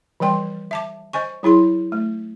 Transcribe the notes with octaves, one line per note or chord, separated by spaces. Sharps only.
E3 F3 G3 G5 C6
E5 A5 D6
C5 D#5 G#5 C#6
F#3 E4 G#4 C6
A3